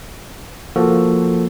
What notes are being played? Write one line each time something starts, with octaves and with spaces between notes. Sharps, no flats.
F3 A#3 F#4 A4